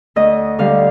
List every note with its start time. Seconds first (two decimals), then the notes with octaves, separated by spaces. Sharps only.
0.16 D2 D#5
0.59 D3 G3 F5